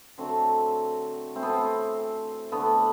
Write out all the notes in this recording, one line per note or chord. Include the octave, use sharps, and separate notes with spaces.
D3 F#3 A3 C4
A2 E3 A3 C4
B3
C4
D3 A3 B3